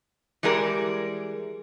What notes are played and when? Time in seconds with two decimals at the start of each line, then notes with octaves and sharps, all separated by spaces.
0.43 E3 G3 G#3 G#4 A#4